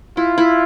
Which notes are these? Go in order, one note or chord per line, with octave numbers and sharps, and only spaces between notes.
E4 F4
E4